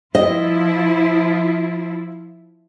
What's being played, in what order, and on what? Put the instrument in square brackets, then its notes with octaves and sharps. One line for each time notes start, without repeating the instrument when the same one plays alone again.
[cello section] F3 E4 F4 [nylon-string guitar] D#5